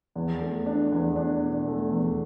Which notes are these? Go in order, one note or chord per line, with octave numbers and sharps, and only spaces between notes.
E2
A3
D4
E2
D4
B2
A3
E2